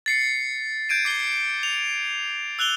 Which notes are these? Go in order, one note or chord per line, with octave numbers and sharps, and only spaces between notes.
A6 C7 C#7
G6 G#6 D7 D#7
D6 C7 G7
F7
E6 F#6 F7 G7